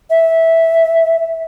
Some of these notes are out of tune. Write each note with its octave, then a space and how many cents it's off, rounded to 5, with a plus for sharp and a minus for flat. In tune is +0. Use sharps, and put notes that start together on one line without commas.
E5 -10